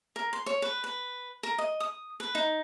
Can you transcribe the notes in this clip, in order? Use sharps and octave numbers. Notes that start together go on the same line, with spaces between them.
A#4
C6
C#5
B4
B4
A#4
D#5
D#6
B4
D#4